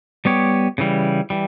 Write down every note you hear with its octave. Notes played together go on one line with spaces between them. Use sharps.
G3 B3 G4 C#5
C#3 E3 G3
E3 G3